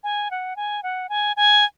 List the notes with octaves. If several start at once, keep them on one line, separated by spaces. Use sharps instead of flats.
G#5
F#5
G#5
F#5
G#5
G#5